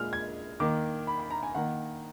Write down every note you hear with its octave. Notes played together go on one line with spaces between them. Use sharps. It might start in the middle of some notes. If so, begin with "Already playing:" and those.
Already playing: A#2 G#3 F6
G#6
D#3 A#3 D6
B5
B5
A#5
G#5
D#3 A#3 F#5